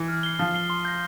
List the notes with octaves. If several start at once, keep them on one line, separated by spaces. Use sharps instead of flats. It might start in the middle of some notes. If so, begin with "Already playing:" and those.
Already playing: E3
F6
C7 G7
F3 F6
C7 G7
C6
G6 A#6